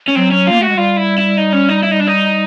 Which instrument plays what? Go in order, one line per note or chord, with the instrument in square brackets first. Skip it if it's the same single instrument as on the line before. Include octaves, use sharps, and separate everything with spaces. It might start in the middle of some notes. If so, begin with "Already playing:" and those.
[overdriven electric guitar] C#4
[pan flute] F#3 [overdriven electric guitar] C4
[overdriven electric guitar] C#4
[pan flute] A#3 [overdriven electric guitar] F4
[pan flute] A3 [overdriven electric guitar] F#4
[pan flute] G#3
[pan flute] G3 [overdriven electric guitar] F4
[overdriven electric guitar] E4
E4
D#4
C#4
D#4
E4
D#4
D4
D#4